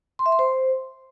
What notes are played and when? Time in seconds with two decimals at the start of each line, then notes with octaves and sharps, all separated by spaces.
0.19 C6
0.26 E5
0.32 C6
0.39 C5